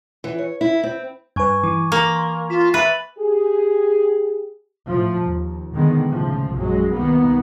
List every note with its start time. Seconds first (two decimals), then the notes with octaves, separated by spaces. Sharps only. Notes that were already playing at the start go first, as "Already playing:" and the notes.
0.24 E3
0.38 C#5
0.61 E4
0.83 C4
1.36 G2 B4 G#5 C#6 G#6
1.63 E3 D6
1.92 A#3
2.16 C6
2.50 F4 B6 E7
2.74 B4 E5 A6
3.19 G4 G#4
4.88 A2 F3
5.25 D#2
5.74 D3 D#3 G#3 B3
6.09 C#2 A2 C3 F3
6.54 A#1 F#2 F#3 G#3
6.95 C2 D#3 A#3 B3